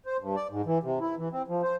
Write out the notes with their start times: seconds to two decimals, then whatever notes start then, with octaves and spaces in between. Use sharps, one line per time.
0.06 C5
0.20 G2
0.36 D5
0.50 G#2
0.65 E3
0.83 C3
1.01 E4
1.17 E3
1.32 C4
1.48 F3
1.63 C5